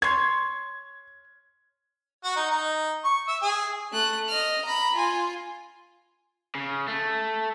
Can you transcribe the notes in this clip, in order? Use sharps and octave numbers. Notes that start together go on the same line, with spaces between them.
C#5 C6 G#6
F#4
D#4
D#4
C#6
E5
G#4
A3 F#6
D#5 F6
A#5 B5
F4 G#5
C#3
A3